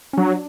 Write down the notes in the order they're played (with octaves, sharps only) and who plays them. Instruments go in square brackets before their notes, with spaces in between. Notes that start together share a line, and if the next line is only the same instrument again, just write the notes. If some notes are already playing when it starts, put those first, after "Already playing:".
[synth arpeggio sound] C#4
[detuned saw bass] F#3 [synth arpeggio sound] D4